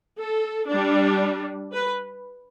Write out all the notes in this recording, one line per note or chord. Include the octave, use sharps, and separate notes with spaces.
A4
G3 D4
B4